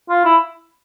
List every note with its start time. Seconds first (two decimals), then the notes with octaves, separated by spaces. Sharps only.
0.09 F4
0.25 E4